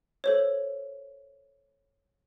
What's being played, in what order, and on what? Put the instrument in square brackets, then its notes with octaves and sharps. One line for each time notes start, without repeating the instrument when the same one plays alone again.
[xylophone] A4 C5 C#5